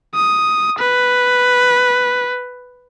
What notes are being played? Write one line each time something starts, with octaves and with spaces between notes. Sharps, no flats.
D#6
B4